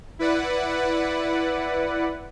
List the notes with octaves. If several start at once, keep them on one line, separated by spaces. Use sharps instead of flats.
E4 B4 D5 F#5